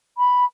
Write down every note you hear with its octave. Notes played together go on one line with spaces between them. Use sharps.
B5